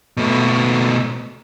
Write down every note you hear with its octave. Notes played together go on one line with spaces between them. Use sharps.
B2 A3